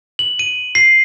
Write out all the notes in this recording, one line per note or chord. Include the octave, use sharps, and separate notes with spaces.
F#7
D#7
C7